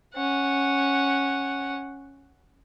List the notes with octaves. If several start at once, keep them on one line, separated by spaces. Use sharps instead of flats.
C#4 F#5